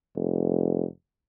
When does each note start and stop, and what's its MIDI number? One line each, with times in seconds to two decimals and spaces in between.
0.16 0.84 29